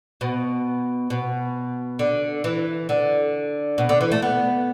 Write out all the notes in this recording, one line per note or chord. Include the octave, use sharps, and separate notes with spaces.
B2
B2
D3
E3
D3
B2
D3
E3
A3
B3